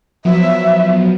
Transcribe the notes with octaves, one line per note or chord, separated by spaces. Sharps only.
F3 F#3 B3 E5